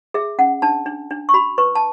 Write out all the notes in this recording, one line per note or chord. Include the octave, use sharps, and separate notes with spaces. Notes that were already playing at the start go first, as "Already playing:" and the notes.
G#4 E5
C#4 F#5
D4 A5
D4
D4
C#6
F#4 B5
B4 C#6
A5